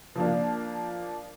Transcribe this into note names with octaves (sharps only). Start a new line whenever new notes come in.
F3 A#3 D4